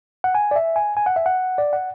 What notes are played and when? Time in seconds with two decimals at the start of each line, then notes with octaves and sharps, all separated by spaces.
0.24 F#5
0.35 G#5
0.51 D5
0.56 E5
0.76 G#5
0.97 G#5
1.06 F#5
1.16 E5
1.26 F#5
1.58 D5
1.73 F#5